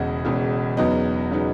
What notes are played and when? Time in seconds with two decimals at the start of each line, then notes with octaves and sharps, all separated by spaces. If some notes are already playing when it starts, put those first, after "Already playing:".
Already playing: E1 E2 C#3 D#5 F#5
0.25 E1 E2 C#3
0.77 E2 C#3 F#3 B3 D#4 D#5
1.31 C#3 F#3 B3 D#4